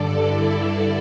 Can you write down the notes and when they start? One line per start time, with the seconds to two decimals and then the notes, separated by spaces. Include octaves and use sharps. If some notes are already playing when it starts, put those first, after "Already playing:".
Already playing: G2 D3 A4 D5
0.26 E4 A4